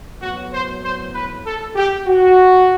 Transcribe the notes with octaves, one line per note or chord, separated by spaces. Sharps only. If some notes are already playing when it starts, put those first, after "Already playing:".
A2 F#3 B3 F#4
C5
C5
B4
A4
G4
F#4